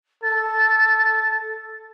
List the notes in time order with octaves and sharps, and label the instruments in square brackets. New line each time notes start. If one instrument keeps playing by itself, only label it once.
[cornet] A4 [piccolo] A6